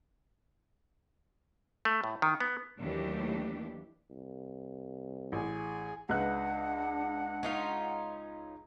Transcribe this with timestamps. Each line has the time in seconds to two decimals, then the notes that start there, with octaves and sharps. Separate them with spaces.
1.85 A3
2.04 A2
2.22 D#3
2.40 B3
2.78 D#2 E3 F#3 A3 D4 G4
4.11 C2
5.32 A1 G#4
6.09 C#2 D4 B4 F#5 F#6
7.43 C#4 D#4 F4